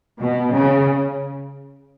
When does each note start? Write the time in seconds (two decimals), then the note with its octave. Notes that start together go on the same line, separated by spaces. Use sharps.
0.20 B2
0.53 C#3